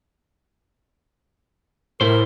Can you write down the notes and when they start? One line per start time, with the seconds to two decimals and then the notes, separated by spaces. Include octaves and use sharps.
2.01 A2 E4 A#4 C5